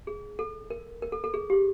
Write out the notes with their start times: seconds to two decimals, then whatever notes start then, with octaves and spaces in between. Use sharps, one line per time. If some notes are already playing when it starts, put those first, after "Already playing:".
0.07 G#4
0.39 A4
0.70 A#4
1.02 A#4
1.12 A4
1.24 A4
1.34 G#4
1.50 G4